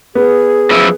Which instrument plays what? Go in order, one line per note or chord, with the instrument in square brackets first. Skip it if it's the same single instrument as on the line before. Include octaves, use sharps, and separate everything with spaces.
[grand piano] B3 [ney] G#4
[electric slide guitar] F#2 F3 E4